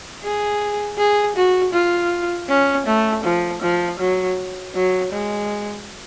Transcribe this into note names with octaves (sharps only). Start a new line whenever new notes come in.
G#4
G#4
F#4
F4
C#4
A3
F3
F3
F#3
F#3
G#3